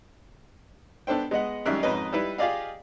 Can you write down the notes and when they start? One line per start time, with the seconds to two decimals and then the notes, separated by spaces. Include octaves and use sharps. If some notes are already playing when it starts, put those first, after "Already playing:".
1.07 B3 D4 A4 C5 G5
1.31 G#3 B3 D#5 F#5
1.65 G#1 F#2 G3 D#4 E5 F#6
1.83 F2 G#2 C#4 B4 D#5
2.13 G3 D#4 E4 B4
2.38 F4 G4 G#4 D5 D#5 F5